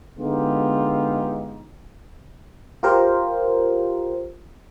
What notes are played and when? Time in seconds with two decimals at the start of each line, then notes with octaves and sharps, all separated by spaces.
0.18 D3 G#3 B3 D#4 F4 G4
2.83 F4 G4 A#4 C5